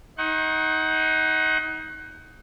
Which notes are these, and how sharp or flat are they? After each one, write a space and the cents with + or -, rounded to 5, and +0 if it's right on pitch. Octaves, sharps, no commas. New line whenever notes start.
D#4 +25 F#5 +20 C#6 -45